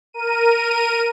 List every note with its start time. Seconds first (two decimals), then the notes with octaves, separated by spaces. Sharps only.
0.13 A#4 D#7